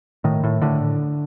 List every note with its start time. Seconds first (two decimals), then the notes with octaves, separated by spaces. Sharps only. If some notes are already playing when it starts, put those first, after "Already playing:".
0.24 A2 D#3
0.43 A2
0.61 A2 D3